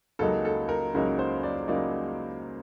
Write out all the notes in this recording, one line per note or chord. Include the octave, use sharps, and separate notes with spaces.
C#2 C#3 F#3 A#3 D#4 A4
A4
A#4
C#2 C#3 F#3 A#3 D#4
C5
D5
C#3 F#3 A#3 D#4 D5